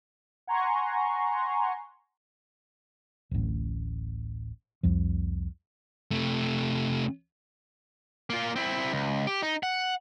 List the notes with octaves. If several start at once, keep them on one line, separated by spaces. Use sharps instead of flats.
F#5 G#5 A#5 C6 C#6
D1 A1
C2 F2 F3
C3 A3
A#3 F4
C4 E4
C#2
G4
D#4
F#5